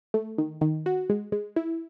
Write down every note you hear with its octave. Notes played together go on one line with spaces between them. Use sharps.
A3
D#3
D#3
F#4
G#3
G#3
E4